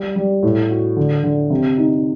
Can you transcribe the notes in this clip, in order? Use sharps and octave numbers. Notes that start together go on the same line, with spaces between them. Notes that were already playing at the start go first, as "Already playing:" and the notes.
Already playing: G3
G3
A2
F#4
D3
D3
C3
D#4